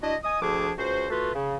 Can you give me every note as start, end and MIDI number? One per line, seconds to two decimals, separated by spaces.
0.02 0.16 62
0.02 0.16 64
0.02 0.16 66
0.02 0.16 75
0.24 0.40 75
0.24 0.40 80
0.24 0.40 87
0.42 0.72 38
0.42 0.72 53
0.42 0.72 62
0.42 0.72 68
0.42 0.72 86
0.78 1.06 37
0.78 1.06 66
0.78 1.06 72
1.10 1.33 57
1.10 1.33 65
1.10 1.33 66
1.10 1.33 71
1.34 1.57 49